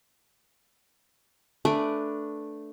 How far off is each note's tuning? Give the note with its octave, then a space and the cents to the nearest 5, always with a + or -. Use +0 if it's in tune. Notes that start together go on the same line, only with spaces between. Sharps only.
A3 +0 D4 +0 B4 +0